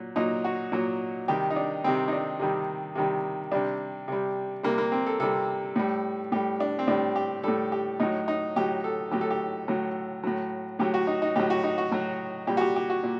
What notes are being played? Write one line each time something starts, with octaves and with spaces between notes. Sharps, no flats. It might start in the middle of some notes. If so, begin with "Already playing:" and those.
Already playing: A#2 F#3
A#2 F#3 D#4
F#4
A#2 F#3
C3 D#3 G3 G4
D#4
D4
C3 D#3 G3 C4
D#4
D4
C3 D#3 G3
C3 D#3 G3
C3 G3 D4
C3 G3
C3 G3 A#3
A#3
C4
A4
C3 G3 A4
A2 G3
A2 G3 G4
D4
C4
A2 G3 D4
G4
A2 G3 A4
G4
A2 F#3 D#4
D#4
A2 F#3 G4
A4
A2 F#3 G4
A4
G4
A2 F#3
A2 F#3
A2 F#3 G4
F#4
D#4
D#4
A2 F#3 G4
F#4
D#4
F#4
A2 F#3
A#2 G3 G4
F#4
G4
G4
F#4
A#2